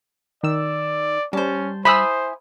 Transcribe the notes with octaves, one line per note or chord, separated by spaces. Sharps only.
D#3 D5 E6
G3 C#4 C5 A5
E4 C5 G#5 B5 D#6 E6